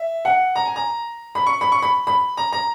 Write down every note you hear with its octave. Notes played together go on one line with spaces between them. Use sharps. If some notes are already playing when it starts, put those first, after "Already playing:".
Already playing: E5
F#5
A#5
G#5
A#5
B5
C#6
B5
C#6
B5
B5
A#5
A#5